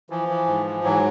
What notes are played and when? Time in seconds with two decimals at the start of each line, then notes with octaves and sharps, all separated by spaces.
0.10 E3 F3
0.29 E3
0.47 G#2
0.66 E3
0.84 G#2 E3 F#3